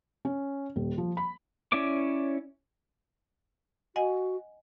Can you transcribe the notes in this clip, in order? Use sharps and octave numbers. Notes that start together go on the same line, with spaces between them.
C#4
D#1
F3
B5
C#4 E4 C#5 D5 D6
F#4 D#5 F#5 G#5